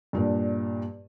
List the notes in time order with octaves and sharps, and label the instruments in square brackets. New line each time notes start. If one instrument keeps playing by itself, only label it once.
[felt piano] G2 A#2 D4